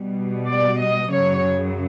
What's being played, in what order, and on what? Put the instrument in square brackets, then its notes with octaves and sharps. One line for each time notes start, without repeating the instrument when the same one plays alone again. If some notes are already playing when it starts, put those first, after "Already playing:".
Already playing: [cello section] B2 G3
D5
D#5
F#2 C#3 F#3 C#5